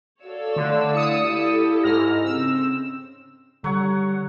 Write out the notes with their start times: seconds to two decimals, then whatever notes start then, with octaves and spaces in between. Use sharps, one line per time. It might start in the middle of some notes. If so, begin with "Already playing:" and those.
0.23 F#4 A4 C#5 D5 F5 E6
0.56 D3 A3
0.94 E4 D#6 C#7
1.25 E4 G4 A4
1.83 G#2 F6 A#6
2.24 C#3 C4 E6
3.64 D3 F#3 G3 C#5 F#5